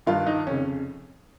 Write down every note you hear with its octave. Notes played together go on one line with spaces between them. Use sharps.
G2 D#3 F4
D#4
F2 C#3 C#4